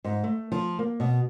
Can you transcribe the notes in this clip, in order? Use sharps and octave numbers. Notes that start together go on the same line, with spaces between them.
G#2
A3
F3
A#3
B2